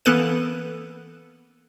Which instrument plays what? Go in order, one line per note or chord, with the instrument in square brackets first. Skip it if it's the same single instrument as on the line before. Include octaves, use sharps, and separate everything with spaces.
[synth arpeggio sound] E3 A#3 B3 A4 B4 D#7